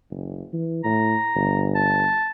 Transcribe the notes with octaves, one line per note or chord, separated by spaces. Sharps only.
F#1
E3
A2 A#5
G1
A5